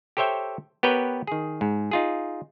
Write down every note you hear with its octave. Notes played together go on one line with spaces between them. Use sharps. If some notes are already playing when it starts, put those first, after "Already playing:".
G4 A4 C5 C#5 E5 G5
B3 G4 A#4 B4 C#5 G5
D#3 G#4
G#2
D#4 F4 G#4